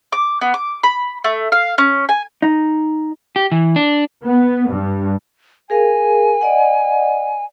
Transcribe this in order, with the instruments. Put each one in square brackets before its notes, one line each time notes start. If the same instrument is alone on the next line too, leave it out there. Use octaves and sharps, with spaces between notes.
[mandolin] D6
B3
D6
B5
A3
F5
C#4
G#5
[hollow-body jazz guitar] D#4
[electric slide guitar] G4
E3
D4
[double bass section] B3
G2
[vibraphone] G#4 A#4 F5 [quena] G#5
[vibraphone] D5 D#5 F#5